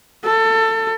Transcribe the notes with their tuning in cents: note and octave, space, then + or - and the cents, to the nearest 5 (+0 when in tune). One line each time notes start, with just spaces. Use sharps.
A4 +25